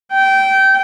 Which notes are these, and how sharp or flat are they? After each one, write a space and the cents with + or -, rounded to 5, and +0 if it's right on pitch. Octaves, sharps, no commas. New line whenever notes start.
G5 -20